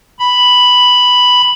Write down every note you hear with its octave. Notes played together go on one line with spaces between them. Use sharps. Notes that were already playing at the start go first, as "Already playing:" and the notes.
B5